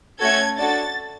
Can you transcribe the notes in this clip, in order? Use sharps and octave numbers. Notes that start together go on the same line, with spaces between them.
A3 C#4 F#4 A4 G#6
D4 F#4 A4 A6